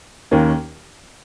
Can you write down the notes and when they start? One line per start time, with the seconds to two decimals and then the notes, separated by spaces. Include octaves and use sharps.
0.31 D#2 D#3 A#3 C#4